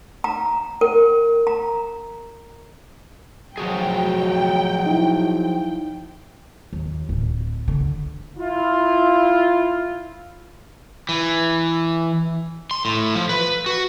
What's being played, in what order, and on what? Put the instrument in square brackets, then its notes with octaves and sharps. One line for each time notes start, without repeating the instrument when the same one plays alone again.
[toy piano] A#5
A#4
A#5
[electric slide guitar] F3 F#4 G#4 [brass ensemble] F#3 [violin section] G5
[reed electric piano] D#4 E4
[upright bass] D#2
D1
D3
[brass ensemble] E4 F4
[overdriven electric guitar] E3
C6
A2
F3
B4
F#4